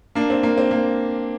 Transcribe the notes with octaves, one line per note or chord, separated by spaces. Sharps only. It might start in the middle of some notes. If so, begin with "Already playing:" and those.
A#3 D4
C4
A#3
C4
A#3